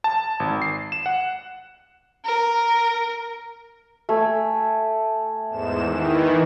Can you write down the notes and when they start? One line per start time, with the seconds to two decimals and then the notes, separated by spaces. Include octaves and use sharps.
0.04 A5
0.40 G#1
0.62 C7
0.92 E7
1.06 F#5
2.25 A#4
4.09 A3 G#5
5.49 E2 G#2 E7
5.83 D#3 E3